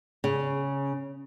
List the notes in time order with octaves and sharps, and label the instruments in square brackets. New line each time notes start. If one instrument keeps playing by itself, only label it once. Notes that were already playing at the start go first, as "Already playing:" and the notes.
[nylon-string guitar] C#3